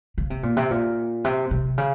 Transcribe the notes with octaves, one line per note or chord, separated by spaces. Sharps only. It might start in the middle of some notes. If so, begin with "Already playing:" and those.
C#3
C3
A#2
C3
A#2
C3
C3
C#3